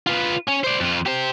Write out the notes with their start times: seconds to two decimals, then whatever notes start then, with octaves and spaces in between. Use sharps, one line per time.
0.07 F4 B4
0.48 C#4
0.64 C5 D5
0.81 F2 F4
1.06 G4 C5